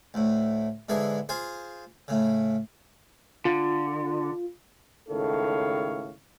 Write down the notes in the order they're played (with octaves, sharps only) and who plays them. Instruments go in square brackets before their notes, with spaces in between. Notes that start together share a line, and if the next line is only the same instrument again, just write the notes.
[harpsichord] D2 A2
G#2 D3 E3 G#4
F4 G#4 C5
A2 C#3
[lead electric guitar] D3 [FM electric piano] F4
[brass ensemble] C#2 A2 D#3 A4 C#5 F5